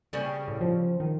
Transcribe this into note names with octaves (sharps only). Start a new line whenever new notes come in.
C#3 G3
A2
F3
D#3